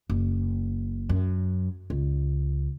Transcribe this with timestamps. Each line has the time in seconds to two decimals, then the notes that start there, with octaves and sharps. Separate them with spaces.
0.10 F#1
1.09 F#2
1.90 C#2